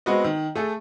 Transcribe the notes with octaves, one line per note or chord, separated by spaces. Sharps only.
G#3 B3 C4 F#4 B4 D#5
D#3
A3 G#4 A4